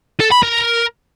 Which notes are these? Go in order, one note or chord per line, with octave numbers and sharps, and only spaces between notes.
A4
B5
A#4